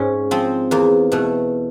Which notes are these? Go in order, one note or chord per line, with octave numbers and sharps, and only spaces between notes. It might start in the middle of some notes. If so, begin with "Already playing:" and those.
Already playing: G#2 C#4
F3 C4
E2 A#3
B2 A3